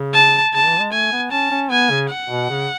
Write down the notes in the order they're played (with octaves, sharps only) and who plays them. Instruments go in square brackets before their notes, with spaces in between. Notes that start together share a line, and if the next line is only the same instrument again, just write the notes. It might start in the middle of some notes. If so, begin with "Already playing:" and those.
Already playing: [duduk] C#3
[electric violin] A5
[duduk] C#3 [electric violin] A5
[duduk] E3
G#3
[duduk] A3 [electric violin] G#5
[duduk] B3
[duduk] C#4 [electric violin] A5
[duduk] C#4
[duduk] B3 [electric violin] G#5
[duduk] C#3
[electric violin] F#5
[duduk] B2
C#3